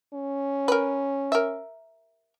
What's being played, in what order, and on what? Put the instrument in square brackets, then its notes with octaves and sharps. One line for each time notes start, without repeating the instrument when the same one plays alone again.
[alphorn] C#4
[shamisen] A#4 B4
A#4 E5